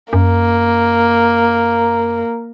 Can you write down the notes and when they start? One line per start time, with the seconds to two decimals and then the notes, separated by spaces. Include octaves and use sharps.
0.13 F#2 A#3